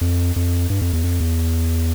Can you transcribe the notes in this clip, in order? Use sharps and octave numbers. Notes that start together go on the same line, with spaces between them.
F2
F2
G2
F2
E2
F2
E2